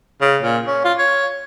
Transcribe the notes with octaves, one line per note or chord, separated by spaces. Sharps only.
C#3
A#2
C#4
F4
C#5